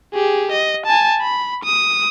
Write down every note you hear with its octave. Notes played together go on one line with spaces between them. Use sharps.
G4 G#4
D#5
G#5 A5
B5
D#6